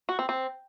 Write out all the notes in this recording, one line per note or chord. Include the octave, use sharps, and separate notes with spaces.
F#4
C4
C4